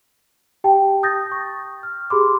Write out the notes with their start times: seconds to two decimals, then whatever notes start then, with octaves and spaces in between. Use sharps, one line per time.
0.64 G4 G5 A5
1.03 D#6 G6 A6 A#6
1.32 C#6
1.83 F6
2.10 G4 G#4 B5 C6 D6